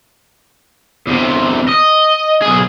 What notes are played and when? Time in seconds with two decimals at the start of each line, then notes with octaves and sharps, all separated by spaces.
1.07 E2 C3
1.69 D#5
2.42 B1 G#4